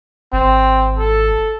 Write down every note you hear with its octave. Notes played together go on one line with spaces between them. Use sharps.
G#1 C4
A4